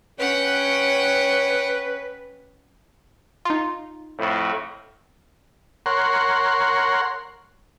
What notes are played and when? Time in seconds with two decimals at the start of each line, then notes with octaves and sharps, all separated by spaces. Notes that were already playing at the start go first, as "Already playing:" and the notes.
0.20 C#4 B4 C#5 F#5 G5
3.45 D#4 F4
4.17 F2 A2
5.86 A#4 C#5 F#5 C6